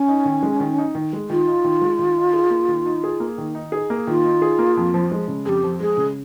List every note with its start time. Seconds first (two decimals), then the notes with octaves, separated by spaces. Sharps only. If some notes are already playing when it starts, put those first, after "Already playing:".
Already playing: C#4
0.08 D#4
0.25 D#3
0.43 G#3
0.60 D#3
0.78 D#4
0.95 D#3
1.13 G#3
1.29 D#3 F4
1.48 D#4
1.64 D#3
1.81 G#3
1.99 D#3
2.17 D#4
2.34 G#4
2.50 A#3
2.68 D#3
2.85 D#4
3.04 G#4
3.20 A#3
3.38 D#3
3.55 D#4
3.72 G#4
3.90 A#3
4.07 D#3 F4
4.24 D#4
4.42 G#4
4.59 A#3
4.77 F2
4.94 F3
5.12 G#3
5.28 C#3
5.45 F2 G#4
5.49 G4
5.64 F3
5.80 G#3 G#4
5.97 C#3